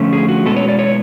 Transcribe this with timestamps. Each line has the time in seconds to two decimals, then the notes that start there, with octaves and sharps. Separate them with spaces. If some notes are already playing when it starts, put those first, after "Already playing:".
Already playing: D3 F3 A3 C#4
0.13 G#4
0.28 F#4
0.45 B2 G#3 B3 A4
0.57 C#5
0.68 D5
0.79 C#5